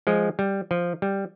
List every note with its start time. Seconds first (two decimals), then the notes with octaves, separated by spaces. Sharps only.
0.07 F3 G#3
0.39 G3
0.71 F3
1.02 G3